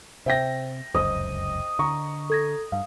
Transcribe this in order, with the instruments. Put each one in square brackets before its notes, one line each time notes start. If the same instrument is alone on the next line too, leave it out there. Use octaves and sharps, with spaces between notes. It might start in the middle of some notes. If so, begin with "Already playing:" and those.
[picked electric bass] C3 [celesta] C5 [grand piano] E5 G5 A#6
[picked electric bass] F1 C#2 F#2 [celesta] C5 [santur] D#5
[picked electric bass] D3 [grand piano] A#5 C#6
[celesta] A4 G#6 A#6
[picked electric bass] G2 [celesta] F5